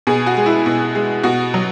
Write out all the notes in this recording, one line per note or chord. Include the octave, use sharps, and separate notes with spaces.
B2 G#4
F#4
G#3
E4
B2
G#3
B2 F#4
F#3